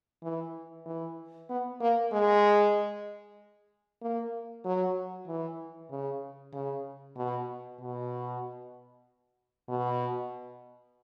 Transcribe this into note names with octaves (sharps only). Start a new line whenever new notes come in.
E3
E3
B3
A#3
G#3
A#3
F#3
E3
C#3
C#3
B2
B2
B2